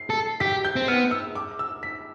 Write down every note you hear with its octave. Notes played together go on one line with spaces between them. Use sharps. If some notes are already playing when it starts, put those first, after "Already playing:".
Already playing: C7
A4
G4 B6
G6
C4
B3 F6
E6
D6
E6
B6